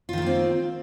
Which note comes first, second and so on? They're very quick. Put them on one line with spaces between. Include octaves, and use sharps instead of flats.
F4 D#3 A3 A#3 C4